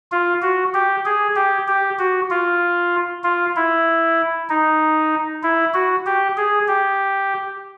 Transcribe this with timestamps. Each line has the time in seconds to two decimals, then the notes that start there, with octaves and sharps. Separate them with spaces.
0.12 F4
0.42 F#4
0.74 G4
1.06 G#4
1.36 G4
1.68 G4
1.99 F#4
2.30 F4
3.24 F4
3.56 E4
4.49 D#4
5.43 E4
5.74 F#4
6.06 G4
6.37 G#4
6.68 G4